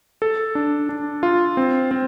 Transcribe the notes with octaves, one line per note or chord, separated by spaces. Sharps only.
A4
D4
D4
F4
C4
C4